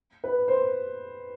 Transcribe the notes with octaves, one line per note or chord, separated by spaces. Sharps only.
B4
C5